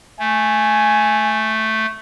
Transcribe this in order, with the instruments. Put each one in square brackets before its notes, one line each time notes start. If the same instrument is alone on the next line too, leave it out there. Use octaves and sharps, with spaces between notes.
[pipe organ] A3 [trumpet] G#5